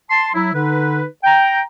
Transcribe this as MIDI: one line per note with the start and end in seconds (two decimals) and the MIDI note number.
0.10 0.29 81
0.10 0.29 84
0.34 0.49 54
0.34 0.49 64
0.54 1.03 50
0.54 1.03 63
0.54 1.03 71
1.24 1.61 79
1.24 1.61 82